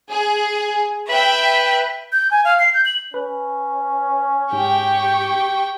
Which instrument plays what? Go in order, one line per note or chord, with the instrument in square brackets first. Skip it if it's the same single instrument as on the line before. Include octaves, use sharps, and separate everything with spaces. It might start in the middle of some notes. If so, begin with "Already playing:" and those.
[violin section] G#4
[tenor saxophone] B4 [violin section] E5 G5
[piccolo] G6
G#5
F5
C7
G6
F#7
[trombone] C#4 [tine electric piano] B4
[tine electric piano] G#2 [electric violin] G4 C#6 [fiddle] G5